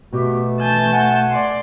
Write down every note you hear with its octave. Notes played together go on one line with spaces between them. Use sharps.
B2 A3 B3 F#4 G4
E3 G#5 A5 G6
F#5 G#5
D5 C6